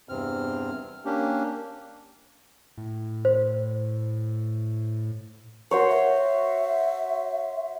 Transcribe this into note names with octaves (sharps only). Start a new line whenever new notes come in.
E2 G2 C3 C4 F6
A#3 C#4 D4 G4
A2
C5
F#4 A#4 C5 C#5
E5